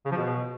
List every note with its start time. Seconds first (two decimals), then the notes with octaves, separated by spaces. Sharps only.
0.06 C#3
0.11 F3
0.17 B2